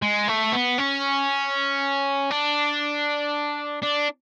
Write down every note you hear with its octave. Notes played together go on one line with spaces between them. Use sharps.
G#3
A3
B3
C#4
D4
D4